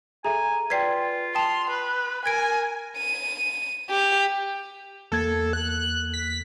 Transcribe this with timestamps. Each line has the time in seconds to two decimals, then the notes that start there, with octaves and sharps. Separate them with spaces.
0.25 G#4 A4 E5 G#5 A#5
0.70 F4 B4 D5 G5 G#6 B6 C7
1.35 G5 A5 C6 D#6 F7
1.70 B4
2.26 A#4 G#5 G#6 D7
2.97 D#7
3.90 G4
5.12 E2 A#3 A4 G#6
5.53 F#6
6.14 B6